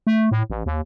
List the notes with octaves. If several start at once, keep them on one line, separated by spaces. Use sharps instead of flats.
A3
A2
A1
D#2